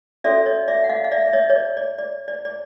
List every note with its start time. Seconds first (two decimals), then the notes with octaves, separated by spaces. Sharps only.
0.24 C#4 F#4 A4 C#5 D5 E5
0.46 C#5 D#5
0.68 D5 E5
0.84 F#5
0.89 D#5 F5
1.04 F5
1.11 D5 E5
1.27 E5
1.33 C#5 D#5
1.50 C#5
1.56 D5
1.77 D5
1.98 D5
2.28 D5
2.45 D5